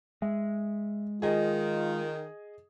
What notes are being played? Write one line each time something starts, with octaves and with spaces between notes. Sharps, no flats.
G#3 E5
D#3 F4 G#4 D#5